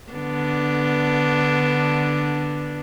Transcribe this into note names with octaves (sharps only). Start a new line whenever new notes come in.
D3 B3 D4